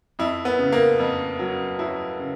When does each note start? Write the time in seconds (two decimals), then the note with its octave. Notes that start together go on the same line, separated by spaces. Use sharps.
0.19 F2 E4
0.45 B3
0.59 C#3
0.72 A#3
0.99 F2
1.39 F#3
1.79 F#3 E4
2.19 C#3